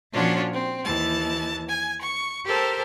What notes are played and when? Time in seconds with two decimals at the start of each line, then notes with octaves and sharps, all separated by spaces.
0.13 A#2 F3 C#4 D4 F4 F#4
0.53 C4
0.84 D#2 E3 A5
1.68 G#5
2.01 C#6
2.44 G4 A4 A#4 C5